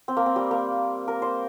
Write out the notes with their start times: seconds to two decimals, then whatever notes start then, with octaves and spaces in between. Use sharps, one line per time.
0.08 C4
0.17 A#3
0.26 C4
0.36 G3
0.51 A#3
1.08 A#4
1.22 C5